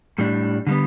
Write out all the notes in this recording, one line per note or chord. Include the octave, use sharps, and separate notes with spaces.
A2 G3 D4
D3 G3 B3